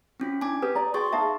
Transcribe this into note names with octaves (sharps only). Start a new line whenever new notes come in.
C4 C#4 F4
D4 E4 G#5 D6
G4 B4 D#6
D5 A#5
F#4 G#4 D5 G5 C6 C#6 A6
D#4 E5 F5 A5